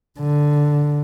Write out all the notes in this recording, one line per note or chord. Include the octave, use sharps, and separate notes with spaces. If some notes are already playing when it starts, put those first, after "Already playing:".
D3